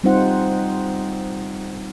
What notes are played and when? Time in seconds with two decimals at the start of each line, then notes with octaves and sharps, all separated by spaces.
0.03 G3 C4 D#4 F4 C5 F#5